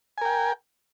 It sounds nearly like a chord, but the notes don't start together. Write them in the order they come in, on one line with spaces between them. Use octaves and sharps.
G#5 A#4 G5